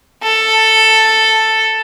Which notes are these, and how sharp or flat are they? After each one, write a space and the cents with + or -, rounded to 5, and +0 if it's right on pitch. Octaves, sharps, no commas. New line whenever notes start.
A4 +5